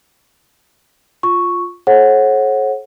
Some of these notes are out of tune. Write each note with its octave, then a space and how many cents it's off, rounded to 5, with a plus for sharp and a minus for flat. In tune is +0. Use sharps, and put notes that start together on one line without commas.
F4 +5 C#6 +0
A4 -45 C#5 -40 F#5 -5